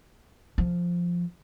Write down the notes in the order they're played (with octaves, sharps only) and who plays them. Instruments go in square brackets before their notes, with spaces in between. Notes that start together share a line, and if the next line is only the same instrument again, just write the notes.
[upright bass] F3